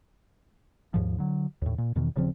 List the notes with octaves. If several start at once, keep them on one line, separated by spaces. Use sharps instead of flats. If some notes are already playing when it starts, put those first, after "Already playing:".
D#2 G#2 F3
D3 F#3
D#2 A2
A#2
E2 B2 D#3 E3
D#1 C#3 F3 C4